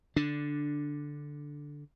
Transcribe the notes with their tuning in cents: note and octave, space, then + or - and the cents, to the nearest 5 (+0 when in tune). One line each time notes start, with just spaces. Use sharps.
D3 -5 D4 +0